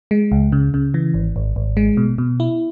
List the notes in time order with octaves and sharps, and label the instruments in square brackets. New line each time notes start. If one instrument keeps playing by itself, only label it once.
[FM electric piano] G#3
C#2
C#3
C#3
E3
G#1
G#1
G#1
G#3
B2
B2
E4